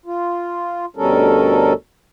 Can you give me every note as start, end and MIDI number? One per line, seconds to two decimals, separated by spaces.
0.06 0.86 65
0.96 1.73 38
0.96 1.73 47
0.96 1.73 55
0.96 1.73 61
0.96 1.73 69
0.96 1.73 70